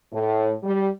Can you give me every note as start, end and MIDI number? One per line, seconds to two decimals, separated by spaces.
0.13 0.53 45
0.63 0.88 55